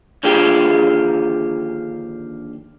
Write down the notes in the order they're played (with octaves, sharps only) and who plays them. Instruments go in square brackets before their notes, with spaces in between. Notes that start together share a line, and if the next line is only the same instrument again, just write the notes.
[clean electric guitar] D#2 D3 F3 G4 G#4 G5